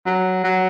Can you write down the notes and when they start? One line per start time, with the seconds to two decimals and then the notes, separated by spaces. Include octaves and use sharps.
0.06 F#3
0.44 F#3